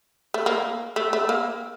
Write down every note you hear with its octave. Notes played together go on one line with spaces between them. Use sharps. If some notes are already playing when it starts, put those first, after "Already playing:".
A3
A#3
A3
A3
A#3